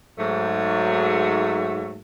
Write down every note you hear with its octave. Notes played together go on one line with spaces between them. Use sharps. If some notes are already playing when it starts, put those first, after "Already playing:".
G#2 F#3 A3